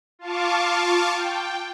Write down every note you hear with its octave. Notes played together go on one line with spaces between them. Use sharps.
F4 F5 A5 C#6 D6
G5